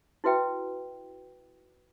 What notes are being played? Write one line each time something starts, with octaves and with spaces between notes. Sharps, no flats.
E4 F#4 B4 E5 G5